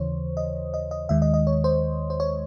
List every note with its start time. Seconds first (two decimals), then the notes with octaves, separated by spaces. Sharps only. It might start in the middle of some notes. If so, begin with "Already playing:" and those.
Already playing: D#2 C#3 E3 C5 C#5
0.37 D#5
0.74 D#5
0.91 D#5
1.09 D#2 D#3 G#3 E5
1.22 D#5
1.34 D#5
1.47 C#5
1.64 C5
2.10 C5
2.20 C#5